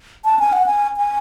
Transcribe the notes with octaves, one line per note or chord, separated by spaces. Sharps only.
A5
G#5
F#5
G#5
G#5